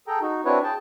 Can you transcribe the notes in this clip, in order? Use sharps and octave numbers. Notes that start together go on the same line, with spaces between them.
G#4 A4 G5 A#5
D#4 F#4
C4 D4 E4 F#4 B4 C#5
G#4 G5 A5